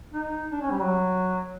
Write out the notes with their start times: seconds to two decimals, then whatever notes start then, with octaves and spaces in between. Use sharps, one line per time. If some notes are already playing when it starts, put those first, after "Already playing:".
0.14 D#4
0.52 D4
0.62 C#4
0.71 G3
0.81 F#3